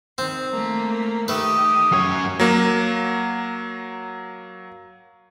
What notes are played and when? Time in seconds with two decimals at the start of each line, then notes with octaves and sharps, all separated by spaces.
0.18 D#3 C4
0.51 A3 A#3
1.28 D#3 A3 G4 B4 D#6
1.92 F#2 C#5
2.40 F#3 A#3